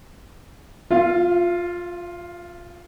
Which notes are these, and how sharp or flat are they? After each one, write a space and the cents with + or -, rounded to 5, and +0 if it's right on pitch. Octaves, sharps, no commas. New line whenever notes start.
F4 +10 F5 -40